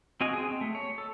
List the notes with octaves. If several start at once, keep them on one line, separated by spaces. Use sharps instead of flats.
C4 F#4 D#5 F5 G#5
C4 G#4
C4
A3
C#5
A4